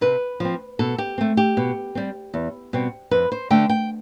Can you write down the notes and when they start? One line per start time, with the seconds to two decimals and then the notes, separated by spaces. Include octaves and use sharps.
0.01 C3 B4
0.40 F3 C4
0.79 B2 A4
0.98 G4
1.18 A3 C4
1.37 G4
1.57 B2
1.95 G3 C4
2.34 E2
2.73 B2 G3 C4
3.11 F2 B4
3.32 C5
3.50 D3 A3 G5
3.69 G5